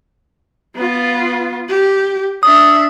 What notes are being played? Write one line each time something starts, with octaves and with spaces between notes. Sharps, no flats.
B3 F4
G4
D4 E5 D#6